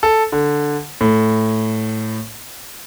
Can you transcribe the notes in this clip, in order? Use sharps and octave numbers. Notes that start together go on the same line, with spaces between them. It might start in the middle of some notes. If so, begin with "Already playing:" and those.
A4
D3
A2